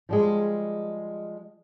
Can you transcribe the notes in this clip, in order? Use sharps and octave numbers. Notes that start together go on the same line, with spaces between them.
F3 G3 G#3